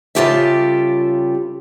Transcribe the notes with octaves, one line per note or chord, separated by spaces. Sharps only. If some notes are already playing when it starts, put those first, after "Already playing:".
C#3 G3 F4 G4 A4 E5